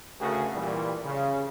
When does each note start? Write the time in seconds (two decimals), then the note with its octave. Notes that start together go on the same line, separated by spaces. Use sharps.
0.21 D2 C#3 A3 F#4 G#4 A#4
0.54 A#2 E3 G3
1.05 C#3